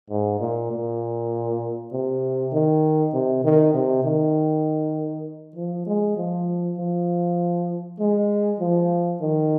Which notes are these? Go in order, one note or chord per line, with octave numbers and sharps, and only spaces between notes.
G#2
A#2
A#2
C3
D#3
C3
D#3
C3
D#3
F3
G#3
F3
F3
G#3
F3
D#3